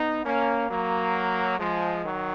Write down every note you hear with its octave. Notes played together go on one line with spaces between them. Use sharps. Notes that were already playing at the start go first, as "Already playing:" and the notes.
Already playing: B3 D#4
A#3 C#4
F#3 A#3
F3 G#3
D#3 F#3